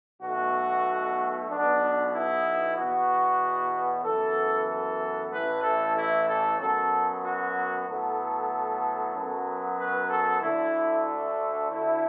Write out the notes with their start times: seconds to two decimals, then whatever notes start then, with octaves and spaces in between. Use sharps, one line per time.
0.22 B1 B2 A3 F#4
1.50 B1 B2 B3 D4
2.14 E4
2.77 E2 B2 B3 F#4
4.04 F#2 E3 B3 A4
4.69 A4
5.32 A1 A2 E3 A3 B4
5.64 A4
5.97 E4
6.28 A4
6.60 F#2 F#3 B3 A4
7.24 F#4
7.88 A2 F#3 B3 A4
9.15 F#2 F#3 B3
9.79 B4
10.10 A4
10.42 D2 D3 A3 E4
11.70 D2 D3 A3 E4